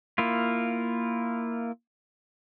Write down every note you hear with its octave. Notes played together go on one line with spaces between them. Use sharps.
A#3 E4 F4